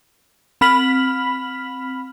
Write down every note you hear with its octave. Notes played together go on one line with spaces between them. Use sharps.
C4 B5 F6 B6 F#7